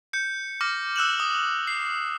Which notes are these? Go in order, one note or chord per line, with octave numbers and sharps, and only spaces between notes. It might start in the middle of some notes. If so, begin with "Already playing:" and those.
G6 C#7
D6 F6 A#6
E6 F#6 E7 F#7
D#6
C7